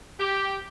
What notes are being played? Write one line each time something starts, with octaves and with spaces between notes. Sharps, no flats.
G4